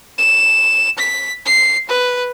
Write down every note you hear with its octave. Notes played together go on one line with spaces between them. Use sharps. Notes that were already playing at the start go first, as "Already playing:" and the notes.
E7
B6
C7
B4